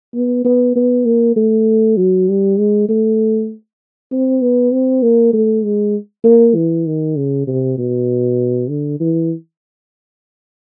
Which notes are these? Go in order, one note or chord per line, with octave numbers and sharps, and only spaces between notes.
B3
B3
B3
A#3
A3
F#3
G3
G#3
A3
C4
B3
C4
A#3
A3
G#3
A#3
E3
D#3
C#3
C3
B2
D3
E3